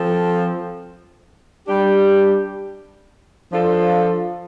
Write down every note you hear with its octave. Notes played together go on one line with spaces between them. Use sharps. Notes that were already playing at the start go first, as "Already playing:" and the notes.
Already playing: F3 C4 A4
G3 D4 G4
F3 D4 F4 A4